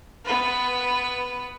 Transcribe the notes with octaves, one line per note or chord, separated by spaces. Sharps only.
B3 B4